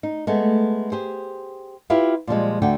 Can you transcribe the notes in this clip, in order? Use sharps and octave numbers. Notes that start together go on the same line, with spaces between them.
D#4
G#3 A3 B3
G4 G#4 C5
E4 F4 G4 B4 E5 F5
A#2 F3 G3 G#3
D2 D3 F#4 A4 G5